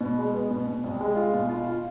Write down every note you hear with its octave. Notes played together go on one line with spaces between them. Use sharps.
B2
G#3
B3
B2
B2
C2
G#3
F4
B2
F4
F4